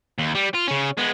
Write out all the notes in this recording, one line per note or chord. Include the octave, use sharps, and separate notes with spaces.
D#2
G3
F4
C#3 C#4
G#3 B3